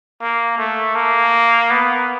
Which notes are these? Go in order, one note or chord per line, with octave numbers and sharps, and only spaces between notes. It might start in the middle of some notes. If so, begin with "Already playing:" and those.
A#3
A3
A#3
B3